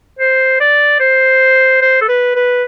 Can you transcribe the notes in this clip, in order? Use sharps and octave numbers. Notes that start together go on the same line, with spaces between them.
C5
D5
C5
C5
A4
B4
B4